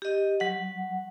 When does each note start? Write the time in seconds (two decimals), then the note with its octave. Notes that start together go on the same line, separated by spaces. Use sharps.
0.02 G4 D#5
0.40 F#3 F#5